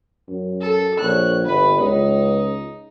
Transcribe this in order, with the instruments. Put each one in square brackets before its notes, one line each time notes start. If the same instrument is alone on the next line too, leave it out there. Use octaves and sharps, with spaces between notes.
[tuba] F#2
[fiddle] A4
[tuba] A#1 [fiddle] C#5 F#6
[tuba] G1 [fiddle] B4
[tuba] C#2 [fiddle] D#4